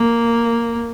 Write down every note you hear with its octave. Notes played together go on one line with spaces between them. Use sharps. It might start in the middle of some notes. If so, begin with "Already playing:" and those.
Already playing: A#3